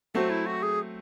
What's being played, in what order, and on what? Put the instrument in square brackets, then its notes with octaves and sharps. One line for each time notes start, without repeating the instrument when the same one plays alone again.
[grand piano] F#3 A3 C4 [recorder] F#4
[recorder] E4
F#4
G#4